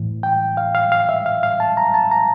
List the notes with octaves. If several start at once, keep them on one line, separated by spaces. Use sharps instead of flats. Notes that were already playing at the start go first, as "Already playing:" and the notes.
Already playing: A2 E3
G5
F5
F5
F5
E5
F5
F5
A5
A#5
A5
A#5